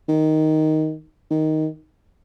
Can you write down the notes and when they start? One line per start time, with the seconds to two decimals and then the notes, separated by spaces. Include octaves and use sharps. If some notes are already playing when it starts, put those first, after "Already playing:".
0.09 D#3
1.30 D#3